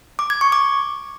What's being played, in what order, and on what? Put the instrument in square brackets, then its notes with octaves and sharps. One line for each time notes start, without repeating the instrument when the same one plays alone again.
[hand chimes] D6
G#6
C#6
D6